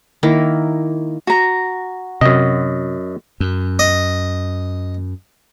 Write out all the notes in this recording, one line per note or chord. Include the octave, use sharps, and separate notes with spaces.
D#3 A#3 E4 A#4
F#4 A#5
F#2 C3 D#5
F#2
D#5